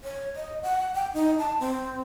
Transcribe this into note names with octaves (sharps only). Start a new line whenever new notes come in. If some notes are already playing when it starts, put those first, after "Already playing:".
C#5
D#5
F#5
G5
D#4
A5
C4